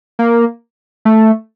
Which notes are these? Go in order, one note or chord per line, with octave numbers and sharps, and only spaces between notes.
A#3
A3